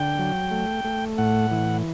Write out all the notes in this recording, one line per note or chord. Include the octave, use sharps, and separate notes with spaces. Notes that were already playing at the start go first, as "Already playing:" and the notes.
Already playing: D3 G5
F#3
A3
A3
A2 F#5
E3